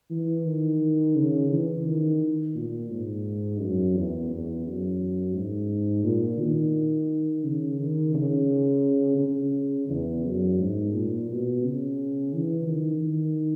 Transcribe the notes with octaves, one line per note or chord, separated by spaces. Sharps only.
E3
D#3
C#3
E3
D#3
A#2
G#2
F#2
E2
E2
F#2
G#2
A#2
D#3
C#3
D#3
C#3
C#3
E2
F#2
G#2
A#2
B2
C#3
E3
D#3
D#3